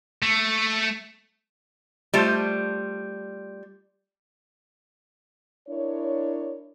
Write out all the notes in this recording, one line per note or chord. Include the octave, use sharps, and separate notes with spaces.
A3
G3 A3 F4 C5
D4 E4 A#4 C#5